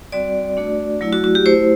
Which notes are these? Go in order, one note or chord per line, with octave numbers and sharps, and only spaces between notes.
G3 C4 F#4 D5
A3 D4 F#4
F#3 A3 E4
F#4
F#4
G4
A3 E4 C5